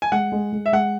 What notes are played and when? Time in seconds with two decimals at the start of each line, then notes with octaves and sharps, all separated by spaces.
0.02 G#5
0.12 G#3 F#5
0.32 G#3
0.52 G#3
0.66 E5
0.73 G#3 F#5